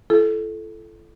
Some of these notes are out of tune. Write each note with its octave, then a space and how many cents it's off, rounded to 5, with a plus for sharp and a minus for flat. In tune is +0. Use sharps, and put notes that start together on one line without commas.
E4 +45 A4 -15